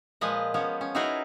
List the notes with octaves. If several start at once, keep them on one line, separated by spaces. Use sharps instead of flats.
A#2 F3 G#3 B4 D#5
F3 B3 C#4
C#4
D#4 E4 F#4 G#4 A#4 B4